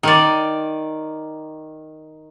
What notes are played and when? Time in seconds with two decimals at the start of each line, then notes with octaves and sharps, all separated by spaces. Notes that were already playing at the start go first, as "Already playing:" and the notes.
0.03 D#3 D5